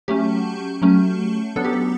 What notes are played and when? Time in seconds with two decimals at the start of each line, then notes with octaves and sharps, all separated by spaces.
0.08 F#3 A3 C#4 G4
0.82 F#3 A3 C#4
1.56 F#3 B3 D4 A4
1.65 G4
1.73 A4